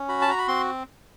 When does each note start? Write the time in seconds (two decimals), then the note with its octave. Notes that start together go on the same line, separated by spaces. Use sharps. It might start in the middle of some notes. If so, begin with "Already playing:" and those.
Already playing: C#4
0.08 F#4 B5
0.22 A5
0.28 F#4 A#5
0.38 B5
0.48 C4 C6